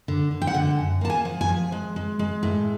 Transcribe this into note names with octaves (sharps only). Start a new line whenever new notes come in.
D3
D3
G5
F#5
D3
F#2
A#3 A5
G#5
F3
G#5
F3
G#3
G#3
G#3
A2